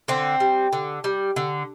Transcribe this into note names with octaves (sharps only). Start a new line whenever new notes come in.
D3 C4
G3
D3
G3
D3